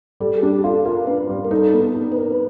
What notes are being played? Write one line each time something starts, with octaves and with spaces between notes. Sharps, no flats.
G3 A4
G#4
D4 G4
F4 A4
F4 A#4
D4 B4
G3
A#4
D#4 A4
B3
D#4
B4
D#4 A#4
B4